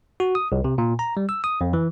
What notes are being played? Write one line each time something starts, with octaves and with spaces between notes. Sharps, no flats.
F#4
D#6
C2
C3
A#2
A#5
G3
E6
D#6
F2
E3